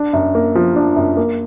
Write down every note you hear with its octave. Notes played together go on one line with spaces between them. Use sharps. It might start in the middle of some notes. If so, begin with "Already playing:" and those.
Already playing: D4
F#2
A#3
F3
D4
F#2
A#3